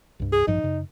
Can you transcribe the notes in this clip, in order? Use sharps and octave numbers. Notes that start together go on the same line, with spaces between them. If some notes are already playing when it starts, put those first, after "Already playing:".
C2 G2
G#4
A1 G2 F3 D#4
F#2 C#3